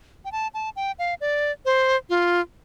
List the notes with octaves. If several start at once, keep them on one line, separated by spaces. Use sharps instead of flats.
G5
A5
A5
G5
F5
D5
C5
F4